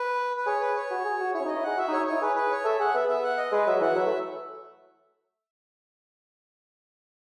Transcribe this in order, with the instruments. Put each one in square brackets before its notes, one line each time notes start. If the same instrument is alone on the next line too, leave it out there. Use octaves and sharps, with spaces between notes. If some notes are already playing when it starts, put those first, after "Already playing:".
Already playing: [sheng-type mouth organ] B4
B4
[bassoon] G#4 [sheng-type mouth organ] C#5
[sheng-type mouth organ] B4
C#5
[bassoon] F#4
G#4
F#4
[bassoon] E4 [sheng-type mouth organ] C#5
[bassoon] C#4
D#4
[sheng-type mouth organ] D#5
[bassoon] E4
[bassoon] G#4 [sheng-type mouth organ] F#5
[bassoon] F#4 [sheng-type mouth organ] E5
[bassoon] D#4
[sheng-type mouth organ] C#5
[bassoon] D#4
[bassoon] E4 [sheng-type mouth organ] C#5
[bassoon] G#4 [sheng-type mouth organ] B4
[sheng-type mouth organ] B4
C#5
[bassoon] A4 [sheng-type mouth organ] E5
[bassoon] G#4 [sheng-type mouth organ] F#5
[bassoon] B3 [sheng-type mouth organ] E5
[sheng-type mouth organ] E5
F#5
D#5
[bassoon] G#3 [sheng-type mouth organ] B4
[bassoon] F#3 [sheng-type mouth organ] E5
[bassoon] E3 [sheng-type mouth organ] F#5
[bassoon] F#3 [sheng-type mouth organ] E5
[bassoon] A3